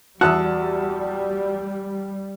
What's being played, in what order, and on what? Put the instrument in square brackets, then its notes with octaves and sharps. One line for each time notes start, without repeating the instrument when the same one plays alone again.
[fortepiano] E2 F#6 [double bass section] G3 [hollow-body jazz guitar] F#4 [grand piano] A5 D#6 E6